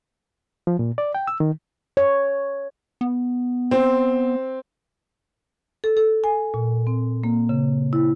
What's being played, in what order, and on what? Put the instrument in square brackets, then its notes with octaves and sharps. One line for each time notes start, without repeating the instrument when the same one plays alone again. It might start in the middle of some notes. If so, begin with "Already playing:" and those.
[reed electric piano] F3
A#2
D5
G5
E6
D#3
[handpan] C#5
[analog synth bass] B3
[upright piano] C4
[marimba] A4
A4
G#5
A#2
C4
A#3
C#3
E4